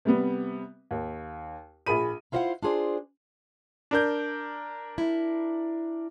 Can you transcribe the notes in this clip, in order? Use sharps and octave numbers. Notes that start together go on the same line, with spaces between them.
C3 G3 B3
D#2
A#1 G#4 B5 D#7
E4 F4 C5 D#5 F5 F#5
D4 F4 G#4 C5 D5
D4 A#4 G6
E4